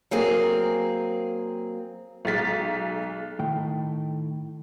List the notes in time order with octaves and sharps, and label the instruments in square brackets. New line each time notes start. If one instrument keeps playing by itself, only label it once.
[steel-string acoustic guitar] F#3 A#3 C4 G#4
[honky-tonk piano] B1 G#3 A6 B6
[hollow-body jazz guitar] A2 D#3 G5